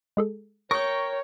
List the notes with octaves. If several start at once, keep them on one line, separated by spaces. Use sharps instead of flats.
G#3 G#4 A4
A#4 C#5 G5 C#6